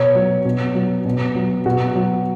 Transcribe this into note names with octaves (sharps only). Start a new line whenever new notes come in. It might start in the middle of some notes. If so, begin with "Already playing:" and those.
Already playing: B2 C#5
F#3
B2
F#3
B2
F#3
B2 F#4
F#3